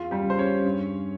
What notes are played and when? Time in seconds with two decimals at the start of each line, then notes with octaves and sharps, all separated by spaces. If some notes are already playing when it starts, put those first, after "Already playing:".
Already playing: E2 F4
0.11 G3 G4
0.25 C#3
0.30 C5
0.38 C#4 C#5
0.65 G2